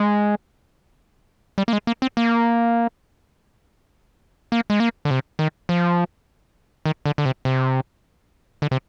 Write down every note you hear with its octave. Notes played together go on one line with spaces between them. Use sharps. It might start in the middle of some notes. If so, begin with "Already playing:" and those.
Already playing: G#3
G3
A#3
G#3
A#3
C4
A#3
A#3
G#3
A#3
D3
C3
D#3
F3
D#3
D3
D3
C3
C3
D3
C3